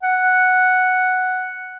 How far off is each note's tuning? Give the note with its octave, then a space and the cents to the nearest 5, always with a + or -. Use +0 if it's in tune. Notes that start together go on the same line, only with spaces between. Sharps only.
F#5 +0